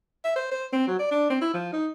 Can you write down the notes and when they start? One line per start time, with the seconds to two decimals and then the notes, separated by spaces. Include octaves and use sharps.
0.24 E5
0.36 C5
0.52 C5
0.73 C4
0.88 F#3
1.00 D5
1.11 D4
1.30 C4
1.42 E4
1.54 F3
1.73 D#4